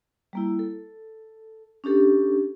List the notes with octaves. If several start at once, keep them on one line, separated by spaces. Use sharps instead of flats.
G3 A#3 E4
A4
C#4 D4 G4 A4